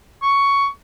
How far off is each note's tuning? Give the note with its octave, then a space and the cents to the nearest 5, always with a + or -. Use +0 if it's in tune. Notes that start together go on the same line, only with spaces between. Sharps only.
C#6 +10